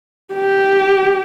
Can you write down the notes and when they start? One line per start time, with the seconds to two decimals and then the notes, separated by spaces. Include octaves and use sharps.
0.34 G4